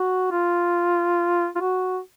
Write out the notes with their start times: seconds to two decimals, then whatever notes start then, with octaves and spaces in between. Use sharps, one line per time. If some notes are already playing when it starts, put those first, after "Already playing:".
Already playing: F#4
0.31 F4
1.56 F4
1.61 F#4